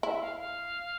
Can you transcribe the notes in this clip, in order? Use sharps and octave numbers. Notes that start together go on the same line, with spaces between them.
E4 E5
F5
F5